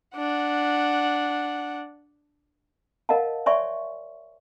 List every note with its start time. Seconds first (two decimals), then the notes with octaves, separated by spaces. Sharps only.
0.16 D4 F#5
3.09 A#4 D#5 F5 F#5 A5
3.46 C#5 D5 E5 G#5 C6 C#6